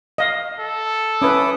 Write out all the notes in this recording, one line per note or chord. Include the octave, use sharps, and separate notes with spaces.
D#5 F5
A4
C#4 E4 B4 D6 D#6